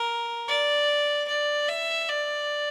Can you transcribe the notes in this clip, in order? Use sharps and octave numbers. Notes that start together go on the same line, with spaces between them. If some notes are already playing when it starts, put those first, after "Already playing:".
Already playing: A#4
D5
D5
E5
D5